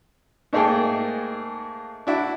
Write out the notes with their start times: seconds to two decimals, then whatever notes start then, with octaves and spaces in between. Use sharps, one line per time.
0.53 G#2 A3 A#3 G#4 A4 G5
2.07 D4 E4 F#4